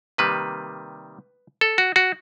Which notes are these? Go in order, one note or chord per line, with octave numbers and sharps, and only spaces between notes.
C3 D#3 G3 A#3 B4
A4
F#4
F#4